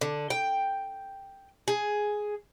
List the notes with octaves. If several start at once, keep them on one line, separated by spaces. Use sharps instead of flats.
D3
G5
G#4